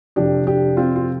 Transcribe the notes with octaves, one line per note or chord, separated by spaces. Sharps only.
F2 C3 F3 D4 G4
D4 G4
C4 F4
F4